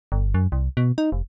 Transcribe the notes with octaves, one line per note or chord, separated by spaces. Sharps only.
G1
F#2
C2
B2
D#4
F1